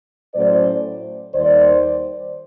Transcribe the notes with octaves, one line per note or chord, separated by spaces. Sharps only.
A2 F#3 A3 C#4 C5 D5
D#2 D#3 G3 C5 D5